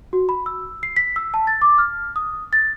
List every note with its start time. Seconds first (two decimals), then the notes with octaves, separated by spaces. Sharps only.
0.13 F#4
0.29 B5
0.46 E6
0.83 C7
0.96 B6
1.16 E6
1.34 A5
1.47 A6
1.62 D6
1.78 F6
2.16 D#6
2.53 A6